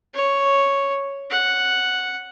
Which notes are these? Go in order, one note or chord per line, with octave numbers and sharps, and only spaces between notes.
C#5
F#5